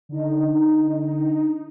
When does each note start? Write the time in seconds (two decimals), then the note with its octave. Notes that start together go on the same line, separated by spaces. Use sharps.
0.09 D3 D#4